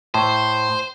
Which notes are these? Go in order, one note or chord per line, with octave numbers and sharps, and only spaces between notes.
A2 C5